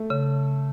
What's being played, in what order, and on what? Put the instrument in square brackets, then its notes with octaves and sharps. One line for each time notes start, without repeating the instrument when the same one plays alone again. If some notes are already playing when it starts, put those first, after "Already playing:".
Already playing: [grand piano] A3
[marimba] C#3